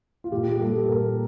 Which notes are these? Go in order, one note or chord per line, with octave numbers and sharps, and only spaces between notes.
F4
A#2 G4
G4
G3 A4
A4
A#2 A#4